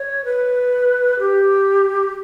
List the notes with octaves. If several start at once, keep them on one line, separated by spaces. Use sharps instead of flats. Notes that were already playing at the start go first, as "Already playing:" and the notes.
Already playing: C#5
B4
G4